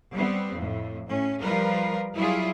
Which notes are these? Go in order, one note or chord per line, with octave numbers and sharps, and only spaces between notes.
G3 B3 C4
F2 A2
A2 C#4
F3 G3 F4 A#4 B4
F#3 G3 E4 F4 G#4